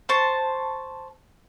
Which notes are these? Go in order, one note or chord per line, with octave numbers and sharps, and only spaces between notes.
C5 A5 C#6